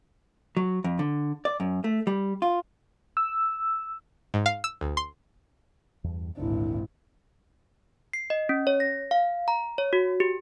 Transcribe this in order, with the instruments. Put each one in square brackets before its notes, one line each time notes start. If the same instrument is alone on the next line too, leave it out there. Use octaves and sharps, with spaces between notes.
[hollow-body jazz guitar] F#3
F2
D3
D5
F#2
A3
G3
F4
[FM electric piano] E6
[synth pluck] G#2
F5
E6
D2
C6
[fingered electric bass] E2 G2
[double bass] G#1 A#2 [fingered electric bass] D2 D4 [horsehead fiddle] E4
[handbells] C7
D#5
C#4
C#5
A#6
F5
A#5
C#5
F#4
G4